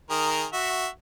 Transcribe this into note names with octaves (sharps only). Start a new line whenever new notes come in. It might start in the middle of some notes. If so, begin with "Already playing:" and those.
D#3 G#4 A#4
F#4 E5